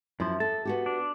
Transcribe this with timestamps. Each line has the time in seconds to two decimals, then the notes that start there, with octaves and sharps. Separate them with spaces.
0.20 F#2 F3 E4
0.40 A4 A5
0.65 B3 F#4 G4
0.86 D4